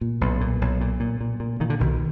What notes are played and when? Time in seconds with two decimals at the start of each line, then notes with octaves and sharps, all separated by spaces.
0.01 A#2
0.21 B1
0.41 A#2
0.61 B1
0.81 A#2
1.00 A#2
1.21 A#2
1.40 A#2
1.60 A#2 D#3
1.70 D3
1.80 B1 D#3